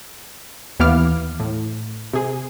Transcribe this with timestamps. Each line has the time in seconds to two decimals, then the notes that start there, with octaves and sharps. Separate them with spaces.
0.79 D#2 E3 B3 F5 D6 F6
1.40 A2
2.13 C3 G#4